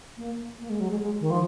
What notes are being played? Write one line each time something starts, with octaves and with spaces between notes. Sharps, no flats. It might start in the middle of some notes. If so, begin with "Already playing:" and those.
A#3
A#3
G#3
F#3
G#3
G#3
D#3
F3